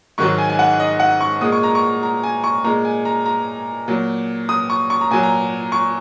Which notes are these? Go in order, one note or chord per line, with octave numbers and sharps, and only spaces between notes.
G#2 D#3 F#3 C#6
G#5
G#5
F#5
D#5
F#5
C#6
A#2 G#3 D#6
C#6
A#5
C#6
A#5
G#5
C#6
A#2 G#3 A#5
G#5
A#5
A#5
A#2 F#3
D#6
C#6
C#6
A#5
A#2 F#3 G#5
A#5
C#6